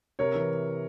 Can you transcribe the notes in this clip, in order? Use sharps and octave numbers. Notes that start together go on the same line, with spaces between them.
C3 A#4 C#5
E3